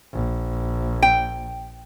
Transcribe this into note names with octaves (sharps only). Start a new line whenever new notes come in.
A#1
G5